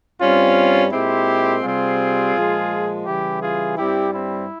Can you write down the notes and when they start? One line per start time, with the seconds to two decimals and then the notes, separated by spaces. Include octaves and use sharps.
0.21 G2 G3 C4 C#4 F4
0.92 A#2 G#3 C4 E4 G4
1.63 C3 G3 C4 F4 G#4
2.36 A#2 F3 G#3
3.06 C#3 E3 G3 E4 G4
3.42 F4 G#4
3.77 G2 G3 C4 E4 G4
4.13 C4 E4